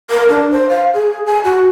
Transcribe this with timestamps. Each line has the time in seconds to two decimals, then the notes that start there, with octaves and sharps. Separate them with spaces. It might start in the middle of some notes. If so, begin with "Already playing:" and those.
0.11 A#4
0.29 D4
0.51 C5
0.69 F5
0.94 G#4
1.26 G#5
1.44 F#4